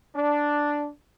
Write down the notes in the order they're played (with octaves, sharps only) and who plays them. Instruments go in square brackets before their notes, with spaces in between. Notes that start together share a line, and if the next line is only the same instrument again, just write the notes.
[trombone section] D4